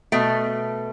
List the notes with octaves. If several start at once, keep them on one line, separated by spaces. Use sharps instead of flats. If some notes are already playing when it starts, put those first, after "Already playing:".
B2 A3